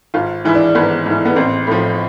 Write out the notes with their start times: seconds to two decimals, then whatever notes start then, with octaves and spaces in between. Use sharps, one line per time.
0.14 G#1 F4
0.45 G#2 E3 E4
0.55 D4
0.75 G#1 B3
1.06 G#2 E3
1.25 B3
1.36 A1 C4
1.67 A2 F3